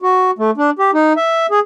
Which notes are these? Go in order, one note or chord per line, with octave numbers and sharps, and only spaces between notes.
F#4
A3
D4
G4
D#4
E5
G#4